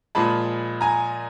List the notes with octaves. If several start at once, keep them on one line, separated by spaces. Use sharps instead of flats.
A#2 F3 G#3 A5 B5
G#5 A#5